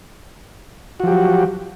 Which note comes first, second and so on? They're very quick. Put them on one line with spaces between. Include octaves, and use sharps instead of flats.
F#4 F3 G4 F#3